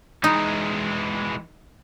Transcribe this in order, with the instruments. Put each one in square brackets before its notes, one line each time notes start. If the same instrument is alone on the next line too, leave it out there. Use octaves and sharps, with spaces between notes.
[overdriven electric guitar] E3 G#3 [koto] D#4